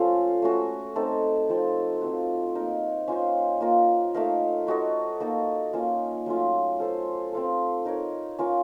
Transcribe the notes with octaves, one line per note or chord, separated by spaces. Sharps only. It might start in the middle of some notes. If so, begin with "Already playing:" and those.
Already playing: F3 A3 C#4 F4 A4 C5 F5
A3 C#4 F#4
A3 C4 D#4 A4
F3 C4 D#4
F3 C4 F#4
A#3 D#4 A#4
C#4 F4 C5 D#5
A#3 F4 A#4
A3 D#4 A#4 F5
D#4 F#4 A4 D#5
A#3 D#4 A4
A#3 C#4 F4
F#3 A3 C#4 F4
C#4 A4 C5
C4 F4 A4
D#4 A#4 C#5
C#4 F4 A#4